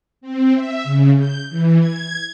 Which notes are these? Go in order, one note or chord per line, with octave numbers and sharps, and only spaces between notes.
C4
E5
C#3
G6
E3
G#6